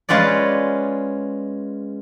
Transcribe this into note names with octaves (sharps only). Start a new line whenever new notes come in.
G#3 C#4 F4 B4 D5